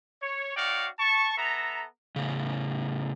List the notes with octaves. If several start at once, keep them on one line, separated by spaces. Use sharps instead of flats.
C#5
D#4 F#4 C#5 D5 F5 G5
A5 C#6
B3 A4 E5 A#5
A2 C#3